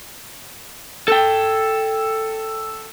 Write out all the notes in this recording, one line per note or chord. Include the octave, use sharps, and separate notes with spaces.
A4 G5